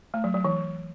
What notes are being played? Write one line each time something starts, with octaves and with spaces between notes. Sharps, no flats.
A3
F#3
F#3
E3